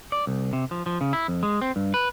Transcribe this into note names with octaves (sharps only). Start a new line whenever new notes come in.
D5
C2
C3
F3
F3
C#3
E4
F2
G#3
C4
G2
B4